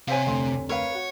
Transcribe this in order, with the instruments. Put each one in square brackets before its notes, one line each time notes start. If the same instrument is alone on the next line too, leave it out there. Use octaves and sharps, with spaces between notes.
[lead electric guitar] C3 [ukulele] C5 C#5 G#5 [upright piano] F5 B6
[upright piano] F1 D2 C6
[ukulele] A#4 B4 F5 [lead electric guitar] C#5
[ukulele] F#4